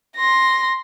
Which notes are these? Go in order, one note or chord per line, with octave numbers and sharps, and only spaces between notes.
C6 A#6